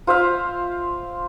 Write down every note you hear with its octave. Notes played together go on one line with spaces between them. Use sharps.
F4 C5 E5 F5